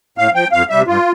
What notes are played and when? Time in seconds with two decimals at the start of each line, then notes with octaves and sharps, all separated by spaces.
0.18 A2 F5
0.34 F3 G5
0.52 F2 F5
0.70 C3 G3 E5
0.87 G2 F4